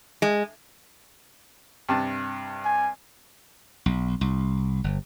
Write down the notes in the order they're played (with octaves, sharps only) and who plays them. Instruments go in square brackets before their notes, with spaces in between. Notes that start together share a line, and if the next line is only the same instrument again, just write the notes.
[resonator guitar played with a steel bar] G#3
[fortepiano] G2 C3 A5
[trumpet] G#5
[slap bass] B1
C2
G1